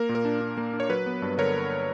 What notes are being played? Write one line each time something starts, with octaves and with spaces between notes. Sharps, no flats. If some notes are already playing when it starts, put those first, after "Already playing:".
Already playing: A#3 A#4
A#2
A#4
D4
D4
A#3
D4
C#5
F#3 B4
B3
G2
D3 A#4 C#5